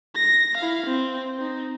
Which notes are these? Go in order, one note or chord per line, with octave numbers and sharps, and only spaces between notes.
A#6
E4 F5
C4
C4 D#4